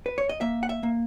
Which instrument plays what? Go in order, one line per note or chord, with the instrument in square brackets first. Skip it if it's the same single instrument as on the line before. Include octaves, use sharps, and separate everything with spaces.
[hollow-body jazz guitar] B4
C#5
D#5
A#3 E5
F#5
E5
A#3